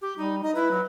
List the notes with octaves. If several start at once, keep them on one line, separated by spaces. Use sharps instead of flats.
G4
G3 D#4
D#4 D#5
E4 B4
F#3